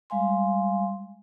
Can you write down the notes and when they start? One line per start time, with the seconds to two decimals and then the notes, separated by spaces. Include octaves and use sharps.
0.10 G3 G#3 F5 G#5 C6